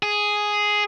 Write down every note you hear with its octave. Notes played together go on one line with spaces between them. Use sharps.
G#4